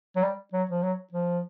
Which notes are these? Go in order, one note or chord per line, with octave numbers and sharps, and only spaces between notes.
F#3
G3
F#3
F3
F#3
F3